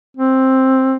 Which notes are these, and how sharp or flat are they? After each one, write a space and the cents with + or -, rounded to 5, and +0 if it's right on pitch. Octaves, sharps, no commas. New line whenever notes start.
C4 +10